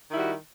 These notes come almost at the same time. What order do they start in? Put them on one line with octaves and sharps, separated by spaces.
D#3 E4 G3 F#4